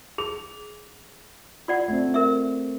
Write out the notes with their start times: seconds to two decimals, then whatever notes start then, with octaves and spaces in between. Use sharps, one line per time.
0.18 G#4 F7
1.68 F4 D5 F#5
1.88 A3 C4
2.14 A#4 E5